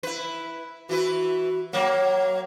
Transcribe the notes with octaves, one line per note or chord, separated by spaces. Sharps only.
E4 B4
E3 E4 F#4 B4
F#3 A#3 C#5